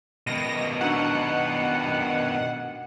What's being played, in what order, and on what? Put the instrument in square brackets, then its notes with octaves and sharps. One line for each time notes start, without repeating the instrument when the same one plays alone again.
[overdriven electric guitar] B2 D#3 [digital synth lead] A#6
[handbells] D4 D#4 F#4 [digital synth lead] F#5